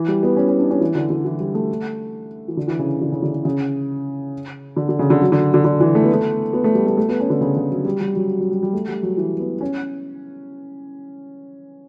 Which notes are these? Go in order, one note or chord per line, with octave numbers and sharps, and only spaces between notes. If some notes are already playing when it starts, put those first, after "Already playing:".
Already playing: E3
G3
B3
C#4
C#4
D4
C#4
E3
D3
D3
E3
G3
A3
E3
D3
E3
C#3
D3
C#3
D3
D3
C#3
D3
D3
C#3
D3
F#3
D3
D3
D3
E3
A3
B3
A3
B3
A3
G3
A3
A3
B3
C#4
D3
C#3
C#3
F#3
G3
G3
F#3
F#3
G3
G3
A3
G3
F#3
E3
B3
C#4